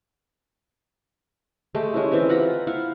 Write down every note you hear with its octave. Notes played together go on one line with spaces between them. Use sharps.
G#3 A3 G4
G#3 C#4 E4
E3 C4 G4 E5
F4 F#5 A#5 B5
E4 F5 F#5